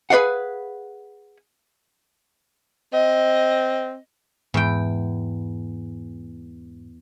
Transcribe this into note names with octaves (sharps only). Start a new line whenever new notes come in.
G#4 B4 D5 F5 F#5
C4 D#5
E2 G#2 G5